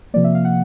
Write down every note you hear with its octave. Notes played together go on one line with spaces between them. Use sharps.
C3 F3 A#3 D5
E5
F5
F#5